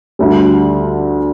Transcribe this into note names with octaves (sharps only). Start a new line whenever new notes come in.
D2 D3 G3